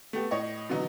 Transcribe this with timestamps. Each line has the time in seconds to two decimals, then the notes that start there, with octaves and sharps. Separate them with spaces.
0.13 A3 B3 G4
0.31 A2 C#5 D#5 C#6
0.69 B2 D3 E3 F#3 D#4